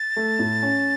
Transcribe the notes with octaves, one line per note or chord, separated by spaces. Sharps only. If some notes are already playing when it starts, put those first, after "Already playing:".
Already playing: A6
A3
A2
C#4